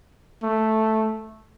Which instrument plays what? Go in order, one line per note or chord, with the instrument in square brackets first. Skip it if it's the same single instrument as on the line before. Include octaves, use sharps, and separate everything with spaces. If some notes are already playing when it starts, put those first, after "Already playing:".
[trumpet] A3